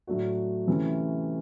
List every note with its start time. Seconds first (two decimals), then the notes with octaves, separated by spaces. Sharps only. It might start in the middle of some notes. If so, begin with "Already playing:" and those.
0.07 A2 F#3 A3 D4 F#4
0.67 C3 E3 A3 C#4